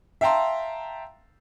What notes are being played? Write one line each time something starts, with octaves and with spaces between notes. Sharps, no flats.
E5 F5 G5 A5 A#5 C6